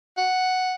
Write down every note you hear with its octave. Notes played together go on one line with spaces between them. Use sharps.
F#5